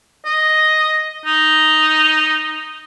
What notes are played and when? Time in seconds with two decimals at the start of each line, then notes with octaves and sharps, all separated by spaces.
0.25 D#5
1.26 D#4